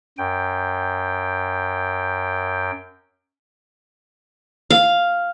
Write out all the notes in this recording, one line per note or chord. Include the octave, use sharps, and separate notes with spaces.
F#2 G5
F5